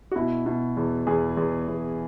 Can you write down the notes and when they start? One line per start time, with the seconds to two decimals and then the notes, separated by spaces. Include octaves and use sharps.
0.11 F#4
0.16 B2 E4
0.46 B2
0.77 E2
1.07 E2 G#4
1.37 E2
1.68 E2